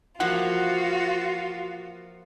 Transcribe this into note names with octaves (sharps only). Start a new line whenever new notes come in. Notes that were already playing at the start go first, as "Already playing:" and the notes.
E3 F3 A#3 F4 F#4 F#5